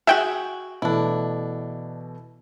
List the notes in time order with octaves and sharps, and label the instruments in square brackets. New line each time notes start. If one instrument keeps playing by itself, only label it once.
[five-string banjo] F#4 G#4 [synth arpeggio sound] E5 F#5 G5
[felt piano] B2 E3 A3 [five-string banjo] D4 E4